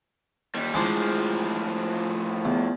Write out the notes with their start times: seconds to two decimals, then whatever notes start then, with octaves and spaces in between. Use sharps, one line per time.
0.55 D#2 G3
0.74 A2 F3 G#3 D4 C5
2.45 E2